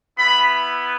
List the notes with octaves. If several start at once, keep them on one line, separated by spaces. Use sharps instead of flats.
B3 E4 B5